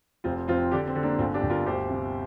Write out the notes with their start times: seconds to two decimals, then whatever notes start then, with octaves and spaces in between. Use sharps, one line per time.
0.24 F1 C4 F4
0.48 F2 C4 F4
0.72 D3 D4 G4
0.88 C4
0.95 D3
1.03 A#3 D4
1.19 G1 C4 F4
1.34 D4 G4
1.43 G1
1.50 F4 A#4
1.66 D2 G4 C5
1.90 C3